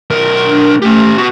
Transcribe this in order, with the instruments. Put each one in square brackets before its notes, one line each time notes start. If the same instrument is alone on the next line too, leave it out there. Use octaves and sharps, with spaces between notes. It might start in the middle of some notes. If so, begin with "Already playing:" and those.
[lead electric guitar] B1 A#4
[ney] D4
[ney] A3 [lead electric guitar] C#4 G4
[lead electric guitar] B3 F#4